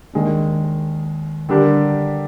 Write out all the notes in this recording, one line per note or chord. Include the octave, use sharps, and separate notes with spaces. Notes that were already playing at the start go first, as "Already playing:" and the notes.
D#2 D#3 G#3 D4
D3 G3 D4 G4 A#4